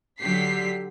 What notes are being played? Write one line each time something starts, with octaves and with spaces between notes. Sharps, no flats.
D3 F#3 G4 B6 C7